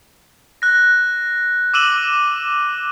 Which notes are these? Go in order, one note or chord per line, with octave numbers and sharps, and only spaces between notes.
F#6 A#6
D6 E6 D#7 E7 F#7 G7